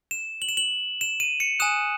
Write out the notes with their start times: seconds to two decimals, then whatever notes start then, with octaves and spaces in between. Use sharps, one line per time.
0.11 E7
0.42 F#7
0.49 E7
0.57 F#7
1.01 E7
1.20 D#7
1.40 C#7
1.60 G#5 D#6 F#6 E7